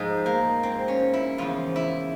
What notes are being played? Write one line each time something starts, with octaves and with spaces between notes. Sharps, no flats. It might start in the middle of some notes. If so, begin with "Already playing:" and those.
Already playing: G#2 F3 G#3
A#3
C4
C#4
E4
E2 C#3 F3 F4
E4